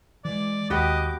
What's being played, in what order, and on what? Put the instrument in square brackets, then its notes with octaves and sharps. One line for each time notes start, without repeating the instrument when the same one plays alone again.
[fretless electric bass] E3 [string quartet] G#3 [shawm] D5
[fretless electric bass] D#2 [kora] B3 F#4 G4 [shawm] D#5 [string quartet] D6